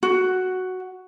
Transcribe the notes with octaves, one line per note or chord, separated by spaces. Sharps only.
F#4